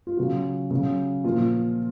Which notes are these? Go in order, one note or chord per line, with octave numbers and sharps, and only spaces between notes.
F4
C#3 F#3 F#4
C#3 F#3
A#2 F3 F4